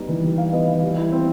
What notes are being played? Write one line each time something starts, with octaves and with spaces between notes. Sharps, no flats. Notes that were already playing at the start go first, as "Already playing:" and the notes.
Already playing: G3 B3 D#4
E3
G3
D#4 F5
B3 D#5
E3 F5
G3
E4
C4